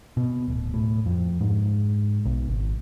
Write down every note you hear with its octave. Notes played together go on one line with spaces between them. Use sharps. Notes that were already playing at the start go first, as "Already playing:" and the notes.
B2
D1
A2
F2
G#2
B1
G#1